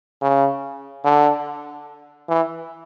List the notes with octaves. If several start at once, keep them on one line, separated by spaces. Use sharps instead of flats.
C#3
D3
E3